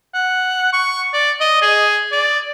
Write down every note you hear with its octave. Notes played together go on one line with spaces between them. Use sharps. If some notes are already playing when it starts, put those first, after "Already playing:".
F#5
C#6
D5
D#5
G#4
D5